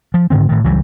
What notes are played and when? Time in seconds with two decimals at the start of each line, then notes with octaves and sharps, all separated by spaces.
0.14 F3
0.30 G#2 D3 D#3 C4
0.49 A2 D#3
0.64 C#2 E3 F#3 G3